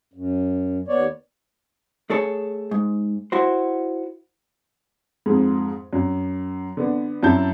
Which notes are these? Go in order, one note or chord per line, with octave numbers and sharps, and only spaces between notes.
F#2
D#2 B3 C#5 D5
A3 G#4 A4 C#5
G#2
E4 F#4 C5
F2 G#2
F#2
D3 B3
F#2 E4 A5 G6